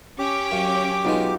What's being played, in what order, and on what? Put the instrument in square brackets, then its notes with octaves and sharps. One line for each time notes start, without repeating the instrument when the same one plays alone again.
[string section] C#4 G5 [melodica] G4 D6
[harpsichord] F#2 [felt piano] F5
[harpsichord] B1 G#3 [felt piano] D#4 F4 F#4